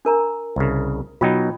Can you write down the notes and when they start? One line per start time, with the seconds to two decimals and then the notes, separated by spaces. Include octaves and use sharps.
0.05 D4 A#4 A#5
0.56 C2 C#3
1.21 B2 F#3 D#4 F4 G5 B5